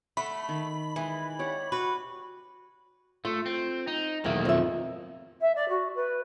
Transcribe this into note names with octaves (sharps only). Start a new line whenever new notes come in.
A3 F#5 B5
D#3
E3 G#3 G#4
G4 C#5 D5 F#5
F#4 B4
A3 F4
C4
D#4
B1 E2 D#3 A#3 E5
F2 E5
E5
D5
F#4
B4